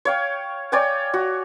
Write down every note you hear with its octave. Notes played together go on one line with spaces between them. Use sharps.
C#5 F5 G5
C#5 D5 G5 G#5
F#4